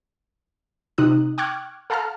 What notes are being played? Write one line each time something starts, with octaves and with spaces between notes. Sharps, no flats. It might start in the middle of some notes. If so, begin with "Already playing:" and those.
C3 D#4 D#6 F#6
G5 C#6 D6 F6 F#6 G#6
A4 F5 F#5 A5 A#5 F6